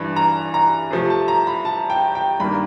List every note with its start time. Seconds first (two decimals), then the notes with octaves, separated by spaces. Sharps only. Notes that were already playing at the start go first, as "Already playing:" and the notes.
Already playing: G2 E3 D4
0.16 A#5
0.54 A#5
0.91 C3 F3 A3
1.10 A5
1.28 A#5
1.47 B5
1.65 A5
1.90 G5
2.15 G5
2.40 G2 D#3 G3 A#3 B5